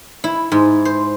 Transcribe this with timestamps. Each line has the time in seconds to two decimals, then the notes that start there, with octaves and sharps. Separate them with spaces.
0.24 E4
0.52 G#2
0.85 C5